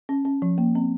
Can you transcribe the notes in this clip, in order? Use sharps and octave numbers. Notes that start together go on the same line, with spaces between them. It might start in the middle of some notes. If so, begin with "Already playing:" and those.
C#4
C#4
F3
A#3
C4